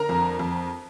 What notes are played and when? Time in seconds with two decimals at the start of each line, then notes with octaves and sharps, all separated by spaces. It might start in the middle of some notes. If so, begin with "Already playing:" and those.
Already playing: D3 A#4 A#5
0.09 F2
0.39 F2